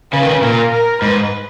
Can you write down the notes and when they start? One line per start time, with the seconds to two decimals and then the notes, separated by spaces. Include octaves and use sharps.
0.12 C#3 B4
0.23 D#3
0.31 C#3
0.42 A#2 A#4
0.72 A#4
1.02 G#2 B4